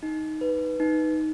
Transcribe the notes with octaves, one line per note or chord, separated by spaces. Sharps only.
D#4
B4
D#4